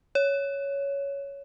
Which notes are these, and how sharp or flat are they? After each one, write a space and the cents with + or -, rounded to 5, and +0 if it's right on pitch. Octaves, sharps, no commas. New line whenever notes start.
C#5 +10